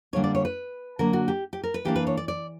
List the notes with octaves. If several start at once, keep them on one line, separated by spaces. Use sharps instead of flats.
D3 G3 A#3 D4 C#5
D5
C#5
B4
D3 F#3 A#3 A#4
F#4
G4
G4
A#4
B4
E3 A#3 D4 G4
B4
C#5
D5
D5